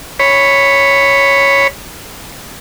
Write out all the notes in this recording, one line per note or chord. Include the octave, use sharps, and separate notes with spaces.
C#5 B5